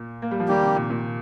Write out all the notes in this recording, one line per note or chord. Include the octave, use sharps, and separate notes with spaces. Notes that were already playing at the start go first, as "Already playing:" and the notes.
Already playing: A#2
A#3
G3
F3
D#3 G3 A#3 G4
C3
A#2
A#2